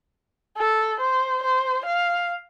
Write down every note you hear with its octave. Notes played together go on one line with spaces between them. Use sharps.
A4
C5
C5
F5